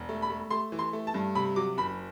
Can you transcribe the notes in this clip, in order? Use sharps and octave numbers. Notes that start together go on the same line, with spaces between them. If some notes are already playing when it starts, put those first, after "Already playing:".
Already playing: E1
A3
B5
A3
A3 C6
E3
C6
A3
A5
G2
C3 B5
F#3 D6
F#1 B5